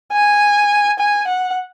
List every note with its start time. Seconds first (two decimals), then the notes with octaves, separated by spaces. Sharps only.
0.13 G#5
0.99 G#5
1.27 F#5